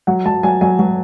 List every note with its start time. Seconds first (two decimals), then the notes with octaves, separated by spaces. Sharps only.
0.07 F#3 F#5
0.26 F#3 A5
0.43 F#3 G#5
0.61 F#3 G#5
0.79 F#3